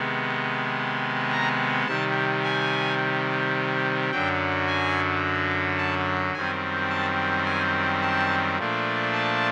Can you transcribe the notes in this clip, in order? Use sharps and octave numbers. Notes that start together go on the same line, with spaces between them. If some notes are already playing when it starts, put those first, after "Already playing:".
Already playing: C3 D#3 G#3 B3
A#5
C3 D#3 G3 A5
G#5
F#2 D3 F#3 G5
G#5
A5
F#2 D#3 G3 C4 G#5
A5
G#5
A5
A#2 F3 A3 D4
A5